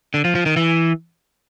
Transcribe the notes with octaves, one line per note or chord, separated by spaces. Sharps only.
D3
F3
F3
D#3
E3